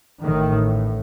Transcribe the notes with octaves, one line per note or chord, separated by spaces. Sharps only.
A1 A2 D#3